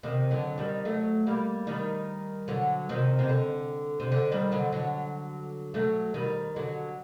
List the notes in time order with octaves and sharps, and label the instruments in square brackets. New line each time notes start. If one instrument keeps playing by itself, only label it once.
[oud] C3 D#3
D3 F#3
D#3 G3
F#3 A3
G3 A#3
D#3 G3
D3 F#3
C3 D#3
C3
D3
C3
D3
D#3 G3
D3 F#3
D3 F#3
F#3 A3
D#3 G3
D3 F#3